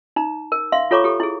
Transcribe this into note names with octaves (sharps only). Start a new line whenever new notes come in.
D#4 A#5
A#4
E5 F5 C6
F4 A4 C#5 A#5 C#6 D6
G4 A4
E4 G#4